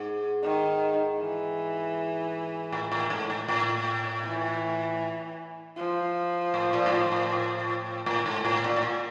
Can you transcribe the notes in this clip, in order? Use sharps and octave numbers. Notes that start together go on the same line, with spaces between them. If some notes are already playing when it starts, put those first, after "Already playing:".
Already playing: G#2
D#3
E3
A2
A2
G#2
A2
A2
E3
F3
A2
A#2
G#2
A2
A2
A2
G#2
A2
A#2
A2
A#2